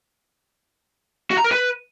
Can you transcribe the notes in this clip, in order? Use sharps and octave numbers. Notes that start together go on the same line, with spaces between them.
F#4
A#5
A#4
B4